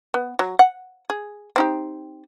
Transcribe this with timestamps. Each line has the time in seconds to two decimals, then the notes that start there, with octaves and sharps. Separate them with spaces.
0.14 B3
0.39 F#3
0.59 F#5
1.10 G#4
1.56 C4 D#4 G4